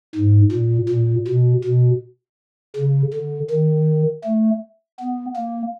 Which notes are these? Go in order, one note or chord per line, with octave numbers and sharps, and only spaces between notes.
G#2
A#2
A#2
B2
B2
C#3
D3
D#3
A3
B3
A#3